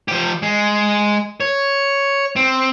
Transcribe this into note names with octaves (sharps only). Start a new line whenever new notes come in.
F3 G4
G#3
C#5
C4